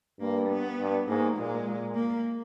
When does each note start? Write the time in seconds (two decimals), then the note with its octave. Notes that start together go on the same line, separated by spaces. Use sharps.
0.20 G2 A#3
0.49 B3
0.79 G2
1.07 G#2 A#3
1.37 A#2 G#3
1.66 A#2
1.95 A#3